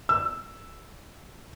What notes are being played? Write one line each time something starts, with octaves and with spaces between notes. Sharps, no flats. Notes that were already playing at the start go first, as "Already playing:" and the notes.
E6